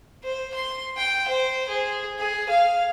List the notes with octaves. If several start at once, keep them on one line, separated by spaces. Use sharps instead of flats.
C5
C6
G5
C5
G#4
G#4
F5